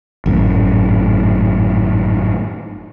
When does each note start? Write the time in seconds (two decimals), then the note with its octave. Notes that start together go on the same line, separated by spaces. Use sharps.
0.26 G#1 F#2 A2